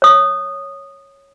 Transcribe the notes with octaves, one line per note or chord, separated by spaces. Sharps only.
C#5 D#6